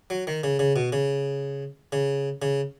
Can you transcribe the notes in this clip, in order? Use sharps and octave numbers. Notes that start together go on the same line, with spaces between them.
F#3
D#3
C#3
C#3
B2
C#3
C#3
C#3